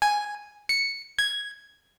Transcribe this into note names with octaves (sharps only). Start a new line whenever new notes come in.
G#5
C#7
G#6